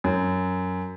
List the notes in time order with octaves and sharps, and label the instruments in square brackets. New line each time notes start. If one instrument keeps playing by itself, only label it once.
[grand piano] F#2